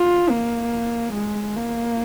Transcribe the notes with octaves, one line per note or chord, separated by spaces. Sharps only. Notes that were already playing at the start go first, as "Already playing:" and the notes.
Already playing: F4
A#3
G#3
A#3